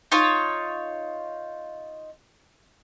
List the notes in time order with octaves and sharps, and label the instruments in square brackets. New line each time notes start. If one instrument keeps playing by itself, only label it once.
[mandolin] D#4 F4 C#5